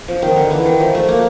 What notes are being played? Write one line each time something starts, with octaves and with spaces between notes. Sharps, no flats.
F3
D#3
D3
E3
D#3
F3
A3
A#3